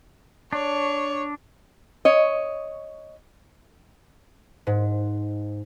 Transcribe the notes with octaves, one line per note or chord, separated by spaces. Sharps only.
D4 C#5
C#5 D#5
G#2